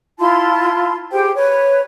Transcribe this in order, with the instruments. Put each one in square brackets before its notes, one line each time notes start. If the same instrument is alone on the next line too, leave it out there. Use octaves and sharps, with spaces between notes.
[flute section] E4 F4 A5 C6
G4 G#4 C5 G5
B4 C#5